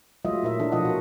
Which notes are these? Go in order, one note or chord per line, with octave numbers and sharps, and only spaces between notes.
F#3 G#3 A3 F4 D#5 E5
A#2 E4 A#4 E5
E3 D4 A4
B2 F3 F4 D#5 F#5
F#4 A#4